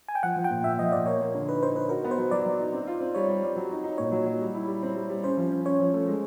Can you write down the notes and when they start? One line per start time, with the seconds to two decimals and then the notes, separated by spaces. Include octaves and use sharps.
0.08 G#5
0.15 G5
0.23 F3 F#5
0.36 F3
0.44 G5
0.50 A#2
0.64 A#2 E5
0.79 F3 D#5
0.92 A#2 D5
1.06 A#3 C#5
1.21 A#3
1.35 D3
1.48 D#4 B4
1.63 D#4 C5
1.75 D#4 B4
1.89 F#4 A#4
2.04 B3
2.11 C5
2.18 F#3
2.31 F#3 D5
2.46 F#3
2.59 D#4
2.73 C4
2.87 F4
3.01 C4
3.15 G3 C#5
3.28 G3
3.43 G3
3.56 F#3
3.71 D#4
3.84 D#4
3.98 A#2 C#5
4.12 F#3
4.26 F#3
4.41 G3
4.55 E4
4.67 G3
4.82 C4
4.96 G3
5.10 G3
5.23 C#4 C5
5.37 F3
5.51 C#4
5.65 C#4 C#5
5.80 F3
5.94 A3
6.08 G#3